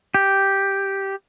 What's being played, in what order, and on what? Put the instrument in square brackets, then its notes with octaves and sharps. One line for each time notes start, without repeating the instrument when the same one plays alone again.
[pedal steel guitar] G4